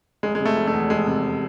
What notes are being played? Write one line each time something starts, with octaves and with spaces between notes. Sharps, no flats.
F1 G#3
G#3
C3
A3
F1
A3
E2
F1 G#3
C3